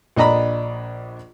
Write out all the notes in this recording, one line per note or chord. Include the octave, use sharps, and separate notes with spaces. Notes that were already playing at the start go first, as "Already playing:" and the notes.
A#1 D4 D#5 A#5 B5